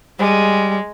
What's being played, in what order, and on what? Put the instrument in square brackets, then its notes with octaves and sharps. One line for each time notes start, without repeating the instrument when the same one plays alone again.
[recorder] G3 [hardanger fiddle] G#3